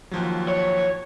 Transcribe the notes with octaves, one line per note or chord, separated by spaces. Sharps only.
D#2 F3 F#3
C#5